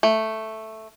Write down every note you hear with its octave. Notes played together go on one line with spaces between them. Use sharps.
A3